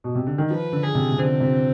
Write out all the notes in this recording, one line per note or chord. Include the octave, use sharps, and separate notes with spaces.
B2
C3
D3
D#3
F3 B4
D3
G#4
C3
C3
D3 C4
C3